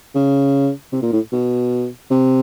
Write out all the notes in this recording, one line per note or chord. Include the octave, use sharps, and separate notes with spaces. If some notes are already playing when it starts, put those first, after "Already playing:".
C#3
C3
A#2
A2
B2
C3